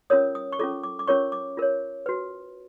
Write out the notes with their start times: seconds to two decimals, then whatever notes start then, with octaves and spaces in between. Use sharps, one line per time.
0.10 C#4 F4 A#4 C#5 D#6
0.35 D#6
0.52 C#6
0.59 C#4 F4 A4 D6
0.83 D6
0.99 D6
1.07 C#4 F4 A#4 C#5 C#6
1.32 D6
1.57 F4 A#4 C#5
2.06 F#4 B4